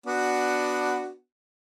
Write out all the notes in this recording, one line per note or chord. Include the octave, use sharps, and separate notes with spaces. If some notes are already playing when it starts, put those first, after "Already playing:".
B3 D4 F#4